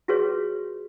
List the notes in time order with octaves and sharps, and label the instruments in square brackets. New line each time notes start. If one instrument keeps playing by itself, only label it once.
[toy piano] F4 F#4 G#4 B4 C#5 C#6